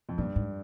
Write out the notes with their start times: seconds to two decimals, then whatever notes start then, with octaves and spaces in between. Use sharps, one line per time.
0.09 F2
0.18 G2 A#2
0.36 G#2